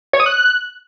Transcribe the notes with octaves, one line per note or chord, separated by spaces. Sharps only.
C#5
D#6
F#6